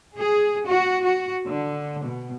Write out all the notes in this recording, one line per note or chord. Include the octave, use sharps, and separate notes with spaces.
G#4
F#4
F#4
D3
B2